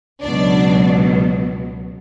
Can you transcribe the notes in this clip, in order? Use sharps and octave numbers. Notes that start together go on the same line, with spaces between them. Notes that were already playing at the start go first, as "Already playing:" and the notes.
C#2 B2 F#3 D4 D5